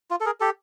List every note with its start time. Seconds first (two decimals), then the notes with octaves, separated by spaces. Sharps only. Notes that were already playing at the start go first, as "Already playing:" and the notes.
0.11 F4
0.20 A4
0.26 G#4 A#4
0.40 G4 A4